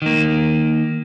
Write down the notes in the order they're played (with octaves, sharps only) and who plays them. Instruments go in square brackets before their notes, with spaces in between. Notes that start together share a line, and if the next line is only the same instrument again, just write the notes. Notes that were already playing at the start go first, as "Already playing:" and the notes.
[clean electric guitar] D#3 A#3